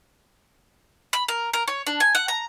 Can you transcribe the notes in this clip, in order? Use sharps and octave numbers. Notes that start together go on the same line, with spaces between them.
B5
A#4
A#4
C#5
D4
G#5
F#5
A#5